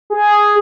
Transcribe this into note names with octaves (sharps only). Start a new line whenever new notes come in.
G#4